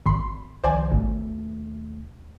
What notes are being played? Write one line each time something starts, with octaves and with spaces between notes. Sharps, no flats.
G#1 B5 C6
C2 D#3 F3 C5 D5 G#5
G#1 D#2 B2 A3